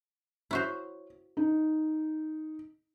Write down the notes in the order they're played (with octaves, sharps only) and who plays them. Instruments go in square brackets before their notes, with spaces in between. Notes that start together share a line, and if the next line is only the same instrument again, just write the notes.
[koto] E4 F#4 C5 [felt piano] C#5
[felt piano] D#4